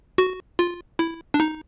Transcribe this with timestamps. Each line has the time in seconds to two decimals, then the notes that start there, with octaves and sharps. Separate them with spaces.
0.18 F#4
0.59 F4
0.99 E4
1.34 D4
1.40 D#4